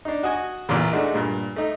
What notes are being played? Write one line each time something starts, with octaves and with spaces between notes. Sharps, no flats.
D4 D#4
F#4 D#5 G#5
A1 E2 A#2
G#3 A3 D4 D#4 F#4
G2 A#2
A3 D#4